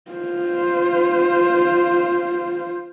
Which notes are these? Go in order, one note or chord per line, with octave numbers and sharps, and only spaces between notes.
F4 C5